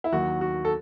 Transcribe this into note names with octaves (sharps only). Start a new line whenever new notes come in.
E4
D#2 D#3 F#3 F#4
F#4
A4